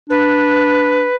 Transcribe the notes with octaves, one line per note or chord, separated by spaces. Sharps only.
D4 B4